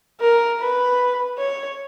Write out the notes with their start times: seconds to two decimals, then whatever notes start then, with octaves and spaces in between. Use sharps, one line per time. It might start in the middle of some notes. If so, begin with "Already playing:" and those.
0.20 A#4
0.60 B4
1.38 C#5